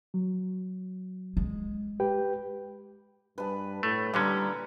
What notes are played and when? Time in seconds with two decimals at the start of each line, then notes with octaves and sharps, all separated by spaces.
0.14 F#3
1.37 G#3
2.00 G4 B4 G5
3.38 G2 B4 A5
3.83 A2 A3
4.14 A#2 D3 G3 C#4 A#5 B5